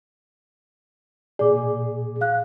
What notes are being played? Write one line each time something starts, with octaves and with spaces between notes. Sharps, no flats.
A#2 G#4 D5 D6
F5 F#6